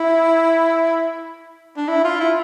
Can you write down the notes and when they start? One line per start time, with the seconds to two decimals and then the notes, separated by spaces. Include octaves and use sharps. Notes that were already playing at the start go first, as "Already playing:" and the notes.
Already playing: E4
1.77 D4
1.88 E4
2.04 F4
2.20 E4